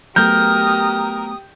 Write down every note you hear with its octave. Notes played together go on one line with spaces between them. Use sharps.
F#3 A3 B3 G4 A#4 D#6 G6